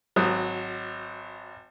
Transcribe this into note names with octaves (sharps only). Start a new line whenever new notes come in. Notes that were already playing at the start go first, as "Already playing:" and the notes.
G#1 F#3 D#6